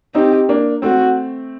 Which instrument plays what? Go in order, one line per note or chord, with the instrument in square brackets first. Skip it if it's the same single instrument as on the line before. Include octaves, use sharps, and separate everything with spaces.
[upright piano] C4 D#4 [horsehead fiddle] G4
[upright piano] A#3 D4
[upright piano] A3 C4 [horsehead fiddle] F#4